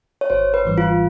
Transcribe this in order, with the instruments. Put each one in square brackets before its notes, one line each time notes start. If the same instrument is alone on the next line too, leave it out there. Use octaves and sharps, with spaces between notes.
[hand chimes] C#5
[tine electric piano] G#1 [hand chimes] C5
[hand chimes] B4
[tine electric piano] G#2 E3 G3
[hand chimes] F4